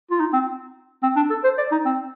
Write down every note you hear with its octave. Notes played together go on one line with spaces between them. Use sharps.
F4
D#4
C4
C4
D4
A4
C5
D5
D#4
C4